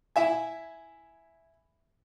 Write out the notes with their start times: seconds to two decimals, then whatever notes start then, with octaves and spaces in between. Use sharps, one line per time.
0.16 E4 E5 G#5